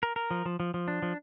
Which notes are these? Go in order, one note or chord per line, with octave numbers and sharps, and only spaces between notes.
A#4
A#4
F3
F3
F3
F3
D4
F3